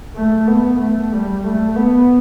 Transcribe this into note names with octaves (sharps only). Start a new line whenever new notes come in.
A3
B3
A3
G3
A3
B3